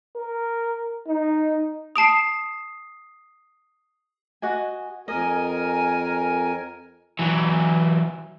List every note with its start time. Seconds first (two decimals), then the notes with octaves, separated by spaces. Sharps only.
0.16 A#4
1.07 D#4
1.96 A5 D#6 C7 D7 F7
4.42 F#4 D#5 G#5
5.08 F2 A#4 D#5 G#5
7.19 E3 F#3